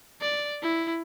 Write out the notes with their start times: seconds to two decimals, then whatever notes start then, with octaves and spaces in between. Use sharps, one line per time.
0.21 D5
0.62 E4